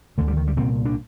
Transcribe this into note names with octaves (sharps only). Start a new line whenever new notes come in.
D2 D3 A3
G3
D#3
G3
C2 A#2 C4
D4